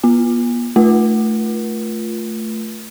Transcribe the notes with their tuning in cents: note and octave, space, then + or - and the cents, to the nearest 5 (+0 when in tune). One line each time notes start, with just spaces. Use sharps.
B3 -45 F4 +0
A3 +0 F4 +0 A#4 +45